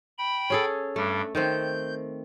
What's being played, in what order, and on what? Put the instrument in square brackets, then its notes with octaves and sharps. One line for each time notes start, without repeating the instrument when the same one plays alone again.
[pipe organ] G5 B5
[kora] C#4 G#4 A4
[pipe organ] G2 G3 [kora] A3
[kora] D#3 A3 C4 [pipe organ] G6